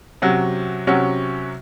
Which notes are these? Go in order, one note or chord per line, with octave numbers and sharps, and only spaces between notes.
C3 F#3 C#4 F#4
C3 F#3 C#4 F#4